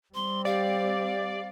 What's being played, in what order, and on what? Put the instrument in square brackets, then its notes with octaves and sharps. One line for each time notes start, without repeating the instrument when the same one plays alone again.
[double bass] G3 C4 [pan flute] C6
[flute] G4 [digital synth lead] D5 [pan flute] F5